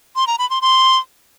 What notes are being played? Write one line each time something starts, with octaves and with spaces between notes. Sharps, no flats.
C6
A#5
B5
C6
C6